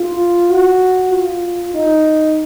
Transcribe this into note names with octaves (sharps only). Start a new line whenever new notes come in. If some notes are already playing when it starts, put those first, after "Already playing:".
Already playing: F4
F#4
F4
D#4